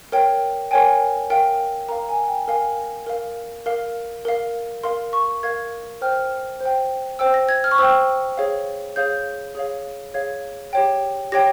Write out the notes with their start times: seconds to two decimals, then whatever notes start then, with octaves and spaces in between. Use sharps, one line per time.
0.12 A#4 C#5 G5
0.71 A#4 C#5 G5 G#5
1.30 A#4 F5 G5
1.89 A#4 F5 A#5
2.09 G#5
2.28 G5
2.48 A#4 F5 G#5
3.06 A#4 F5
3.66 A#4 F5
4.25 A#4 F5
4.83 A#4 F5 C6
5.13 C#6
5.43 A#4 F5 G#6
6.01 C5 G5 F6
6.60 C5 G5
7.19 C5 G5 E6
7.34 A#6
7.49 G#6
7.64 F6
7.71 C#6
7.78 C5 G5 E6
8.37 G#4 C#5 F5
8.96 G#4 C#5 F5 G6
9.55 G#4 C#5 F5
10.14 G#4 C#5 F5 G#6
10.73 G4 C#5 G5
11.32 G4 C#5 G5 A#6